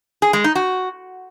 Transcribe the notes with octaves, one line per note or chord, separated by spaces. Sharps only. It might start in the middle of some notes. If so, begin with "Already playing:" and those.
G#4
G#3
D#4
F#4